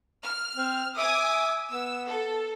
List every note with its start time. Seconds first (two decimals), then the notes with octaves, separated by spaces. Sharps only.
0.24 F6
0.55 C4
0.97 E5 G#5 D6 D#6
1.72 B3 E6
2.07 A4